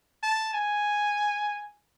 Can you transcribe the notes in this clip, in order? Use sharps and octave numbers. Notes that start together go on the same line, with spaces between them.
A5
G#5